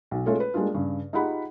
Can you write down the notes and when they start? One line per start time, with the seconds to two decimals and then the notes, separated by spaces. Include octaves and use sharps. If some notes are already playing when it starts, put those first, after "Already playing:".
0.11 B1
0.26 G#3 A3 C#4 F4 A4 C#5
0.40 B4
0.54 G3 G#3 A#3 D4 F4
0.74 G2 C#3
1.13 D#4 F4 G4 G#4 F#5 B5